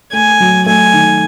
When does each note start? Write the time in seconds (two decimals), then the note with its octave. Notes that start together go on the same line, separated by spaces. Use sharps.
0.13 A3 G#5
0.40 F#3
0.66 A3 G#5
0.93 D#3